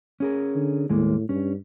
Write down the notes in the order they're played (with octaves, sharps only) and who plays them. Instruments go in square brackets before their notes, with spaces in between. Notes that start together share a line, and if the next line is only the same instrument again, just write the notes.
[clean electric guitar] C#4 G#4 A#4
[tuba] D3
[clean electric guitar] D#2 G#3 A#3 [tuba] A2
[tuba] G2 [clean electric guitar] C#4